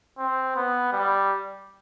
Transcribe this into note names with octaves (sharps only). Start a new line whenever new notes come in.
C4
B3
G3